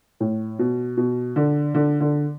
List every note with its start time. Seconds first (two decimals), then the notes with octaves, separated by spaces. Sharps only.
0.20 A2
0.59 B2
0.97 B2
1.36 D3
1.74 D3
2.00 D3